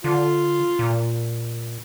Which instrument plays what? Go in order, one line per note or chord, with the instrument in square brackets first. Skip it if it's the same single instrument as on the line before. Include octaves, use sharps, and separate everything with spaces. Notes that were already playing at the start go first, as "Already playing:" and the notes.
[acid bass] D3 [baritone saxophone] F4
[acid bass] A#2